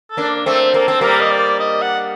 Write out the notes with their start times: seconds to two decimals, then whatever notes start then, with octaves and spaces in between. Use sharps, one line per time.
0.11 A4
0.17 A#3 D4
0.46 A3 C4
0.74 A#3 A4
0.88 C4
1.01 G3 A#3 A#4
1.21 D#5
1.31 D5
1.60 D#5
1.82 F#5